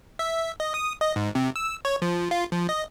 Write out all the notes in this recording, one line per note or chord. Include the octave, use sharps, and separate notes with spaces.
E5
D#5
D#6
D#5
G#2
C3
E6
C#5
F3
F4
F3
D#5